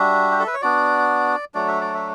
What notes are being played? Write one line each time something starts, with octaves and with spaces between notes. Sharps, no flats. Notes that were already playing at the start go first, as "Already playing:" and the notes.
Already playing: G3 D4 F#4 E5
G4
A4
B4
C#5
B3 D4 F#4 D5
F#3 A3 D4 F#4 D5
E5
D5
E5